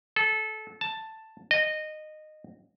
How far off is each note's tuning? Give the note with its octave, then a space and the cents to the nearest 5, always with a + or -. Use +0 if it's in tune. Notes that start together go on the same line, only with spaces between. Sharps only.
A4 -25
A5 +5
D#5 -15